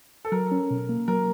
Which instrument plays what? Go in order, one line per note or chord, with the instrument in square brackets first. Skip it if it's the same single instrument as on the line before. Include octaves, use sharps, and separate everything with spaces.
[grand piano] A4
[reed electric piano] F#3 [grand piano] A#4
[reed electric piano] C#4
B2
A#3
[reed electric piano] F#3 [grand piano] A#4